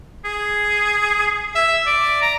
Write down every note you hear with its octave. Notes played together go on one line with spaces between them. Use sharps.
G#4
E5
D5
A#5